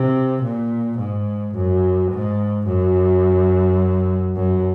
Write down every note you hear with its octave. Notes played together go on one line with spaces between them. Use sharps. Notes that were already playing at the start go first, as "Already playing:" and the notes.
Already playing: C3
A#2
G#2
F#2
G#2
F#2
F#2